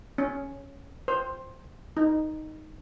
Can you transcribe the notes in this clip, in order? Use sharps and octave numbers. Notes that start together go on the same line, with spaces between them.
C#4
C5
D#4